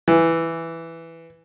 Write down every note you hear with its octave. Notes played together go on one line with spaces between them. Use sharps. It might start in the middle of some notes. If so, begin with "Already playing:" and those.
E3